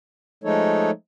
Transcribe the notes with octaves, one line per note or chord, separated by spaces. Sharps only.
F3 G#3 A3 D#4 A4 C#5